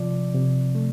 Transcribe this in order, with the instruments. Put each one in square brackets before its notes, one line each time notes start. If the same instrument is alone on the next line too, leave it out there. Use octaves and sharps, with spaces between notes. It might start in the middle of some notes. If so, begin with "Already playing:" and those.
Already playing: [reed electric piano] C3 F3 D5
C3
A3